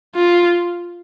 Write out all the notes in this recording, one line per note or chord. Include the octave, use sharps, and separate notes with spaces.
F4